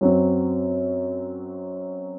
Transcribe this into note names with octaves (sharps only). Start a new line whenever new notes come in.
F#2 F#3 C4